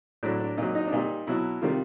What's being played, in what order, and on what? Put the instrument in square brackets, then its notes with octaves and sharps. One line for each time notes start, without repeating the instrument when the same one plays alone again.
[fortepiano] A2 F#3 D4
D4
A#2 F#3 D#4
D#4
D4
A#2 G3 D#4
B2 F#3 E4
C3 D#3 G3 F4